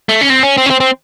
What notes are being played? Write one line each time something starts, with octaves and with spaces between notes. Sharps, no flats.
A3
C#4
C4
C#4
C4
C#4
C4
C4